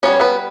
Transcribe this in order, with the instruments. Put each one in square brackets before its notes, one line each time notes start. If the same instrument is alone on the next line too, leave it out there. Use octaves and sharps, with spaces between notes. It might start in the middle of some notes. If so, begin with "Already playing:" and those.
[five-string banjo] G3 B3 C#4 D4 C#5
B3 B4